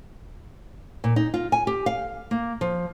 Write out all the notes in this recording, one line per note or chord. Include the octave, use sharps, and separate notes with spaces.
A#2
D#4
F4
G#5
G4
F5
A#3
F3